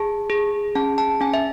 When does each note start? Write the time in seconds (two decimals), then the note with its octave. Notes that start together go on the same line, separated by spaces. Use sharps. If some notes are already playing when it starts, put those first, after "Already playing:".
Already playing: G#4 A5
0.30 G#4
0.75 C#4 A5
0.98 A5
1.20 C#4 G#5
1.34 E5